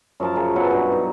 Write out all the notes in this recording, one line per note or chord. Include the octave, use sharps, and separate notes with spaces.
F#2 F3 A#4 A5
C#3
B2 F#3 E4 F#5
G2 F#3 F#4
D#4